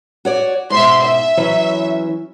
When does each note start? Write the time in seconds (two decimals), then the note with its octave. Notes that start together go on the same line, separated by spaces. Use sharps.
0.25 F#4 C#5 D5
0.70 G#2 B2 E5 C6
1.01 E5
1.37 E3 F#3 C#4